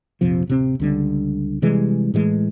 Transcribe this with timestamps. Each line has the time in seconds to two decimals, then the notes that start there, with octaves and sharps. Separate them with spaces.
0.21 A#1 F2 C3 F3
0.47 D1 C3 C4
0.79 C#2 D3 G3
1.62 C3 E3 G3 G#3
2.14 A2 E3 G3 G#3